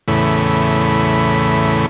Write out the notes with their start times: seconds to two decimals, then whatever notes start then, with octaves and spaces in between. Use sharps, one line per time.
0.08 E2 A2 C#3 B5